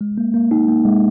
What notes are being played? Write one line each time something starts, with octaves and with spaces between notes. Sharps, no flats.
G#3
A#3
A#3
D#4
A#3
G#3